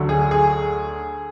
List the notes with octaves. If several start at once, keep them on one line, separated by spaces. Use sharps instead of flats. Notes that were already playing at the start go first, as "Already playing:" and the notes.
Already playing: D2 D3 F#3 A3
G#4
G#4